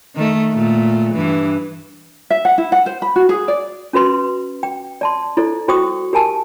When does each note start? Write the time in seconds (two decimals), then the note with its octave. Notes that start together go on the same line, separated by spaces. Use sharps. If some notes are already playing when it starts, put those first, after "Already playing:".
0.15 D#3 A3
0.52 A#2 A3
1.13 G2 E3
2.30 E5
2.45 F#5
2.58 E4
2.72 F#5
2.86 C5
3.02 B5
3.16 F#4
3.29 G#4
3.48 D5
3.93 C#4 F#4 B4 C6
4.63 G5
5.01 D5 A5 C6
5.37 E4 A4 C5 D5
5.68 F#4 C5 G5 C#6 D#6
6.13 G4 A#4 G#5 A5